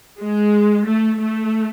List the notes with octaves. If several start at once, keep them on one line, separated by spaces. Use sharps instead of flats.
G#3
A3
A3